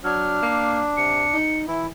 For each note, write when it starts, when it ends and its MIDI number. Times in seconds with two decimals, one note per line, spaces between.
0.04 0.40 54
0.04 1.37 62
0.04 0.78 89
0.43 0.84 58
0.97 1.25 48
0.97 1.59 97
1.34 1.64 63
1.68 1.90 52
1.68 1.87 64